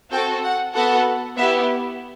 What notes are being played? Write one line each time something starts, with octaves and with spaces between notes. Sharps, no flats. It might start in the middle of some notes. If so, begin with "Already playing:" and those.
C4 F#4 A4 G5
F#5
B3 F#4 A4 F#5
B3 E4 G4 E5